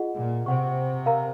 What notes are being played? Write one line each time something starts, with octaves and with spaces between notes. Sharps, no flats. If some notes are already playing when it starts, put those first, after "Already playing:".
Already playing: F4 G#4 D#5 F#5
A#2
C3 C5 F#5 C#6
A#4 F5 A#5